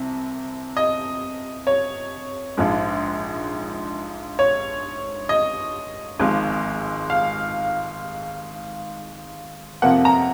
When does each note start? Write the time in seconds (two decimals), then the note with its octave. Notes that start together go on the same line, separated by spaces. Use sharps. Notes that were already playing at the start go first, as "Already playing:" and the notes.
Already playing: C2 C3
0.77 D#5
1.67 C#5
2.57 A#1 G#2 F3 G#3
4.39 C#5
5.29 D#5
6.20 G#1 G#2 F3 G#3
7.10 F5
9.82 F2 C3 F3 A#3 F#5
10.05 A#5